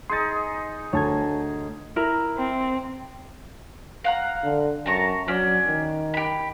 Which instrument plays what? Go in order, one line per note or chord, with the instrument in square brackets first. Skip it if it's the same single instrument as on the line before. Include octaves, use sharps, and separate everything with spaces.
[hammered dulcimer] D#4 G#4 [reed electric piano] C6 A6
[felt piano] D2 [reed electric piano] C#5 A5 G#6
[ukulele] E4 A#4 A#5
[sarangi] C4
[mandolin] F5 F#5 A#5
[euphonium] D3
[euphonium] F#2 [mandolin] A5 A#5 C#6
[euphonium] F#3 [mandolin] C#4 D4 D5
[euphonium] D#3
[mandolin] G4 B5